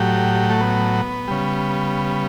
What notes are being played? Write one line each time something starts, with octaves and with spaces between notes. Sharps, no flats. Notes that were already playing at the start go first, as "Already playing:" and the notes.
Already playing: A2 F#3 G4
A3
B3
C#3 G3